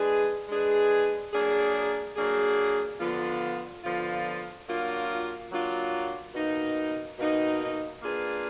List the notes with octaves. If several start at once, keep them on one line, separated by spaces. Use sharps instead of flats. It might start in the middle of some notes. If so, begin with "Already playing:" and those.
Already playing: G#3 D4 G#4 B4
G#3 D4 G#4 B4
F#3 A#3 D4 G#4
F#3 A#3 D4 G#4
D3 F3 B3 F4
D3 F3 B3 F4
F#3 A#3 D4 F4
F#3 A#3 D4 F4
B2 A#3 D#4
B2 A#3 D#4
A#3 D4 F4 G#4 B4